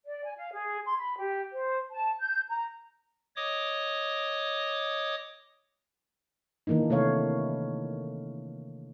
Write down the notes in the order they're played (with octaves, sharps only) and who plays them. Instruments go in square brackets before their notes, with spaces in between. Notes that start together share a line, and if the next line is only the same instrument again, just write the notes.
[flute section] D5
G#5
F5
G#4
C6
B5
G4
C5
A5
G6
A#5
[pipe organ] C#5 D#5 D6 D#6
[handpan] D#3 E3 A#3 D4 D#4
C3 A3 E4 C#5 F5